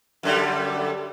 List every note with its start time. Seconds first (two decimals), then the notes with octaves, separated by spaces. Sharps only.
0.23 F#2 D3 G3